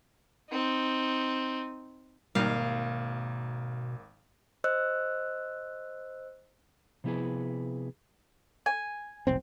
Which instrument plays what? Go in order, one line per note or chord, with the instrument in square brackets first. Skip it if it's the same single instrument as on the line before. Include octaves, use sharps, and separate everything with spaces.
[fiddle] C4 D#4
[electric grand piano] G#1 A#3 [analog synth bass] B2 [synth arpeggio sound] G3 D#4 [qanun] F5
[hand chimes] C5 D#5 E6 F#6
[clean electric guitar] C3 F3 B3 E4 G#4 B4
[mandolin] G#5
[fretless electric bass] F1 B1 C4